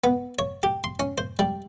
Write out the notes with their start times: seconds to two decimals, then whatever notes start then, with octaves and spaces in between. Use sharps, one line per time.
0.04 B3
0.39 C#5
0.63 G4
0.84 C6
1.00 C#4
1.18 C5
1.39 G3